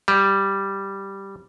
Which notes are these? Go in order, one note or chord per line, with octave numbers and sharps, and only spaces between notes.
G3